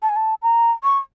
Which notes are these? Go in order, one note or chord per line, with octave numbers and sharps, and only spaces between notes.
A5
G#5
A5
A#5
C#6